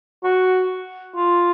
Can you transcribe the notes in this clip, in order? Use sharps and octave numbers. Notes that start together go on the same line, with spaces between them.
F#4
F4